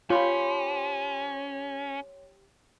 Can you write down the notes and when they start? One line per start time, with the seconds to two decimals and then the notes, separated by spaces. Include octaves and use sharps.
0.10 C#4 F4 G4 C5 C#5 B5